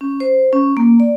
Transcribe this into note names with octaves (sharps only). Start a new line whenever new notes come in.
C#4
C5
C#4
A#3
D5